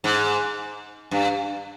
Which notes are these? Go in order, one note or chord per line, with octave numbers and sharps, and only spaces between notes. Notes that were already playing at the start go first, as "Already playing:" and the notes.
G#2
G2